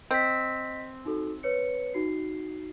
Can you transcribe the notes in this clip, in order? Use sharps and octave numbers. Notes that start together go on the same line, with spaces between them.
C4 D#5 B6
D#4 F#4 A4
B4 C#5 C#7
D#4 F#4 C7